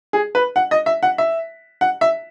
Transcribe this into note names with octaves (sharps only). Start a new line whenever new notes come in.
G#4
B4
F#5
D#5
E5
F#5
E5
F#5
E5